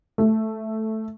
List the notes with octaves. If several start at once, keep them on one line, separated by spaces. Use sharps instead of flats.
A3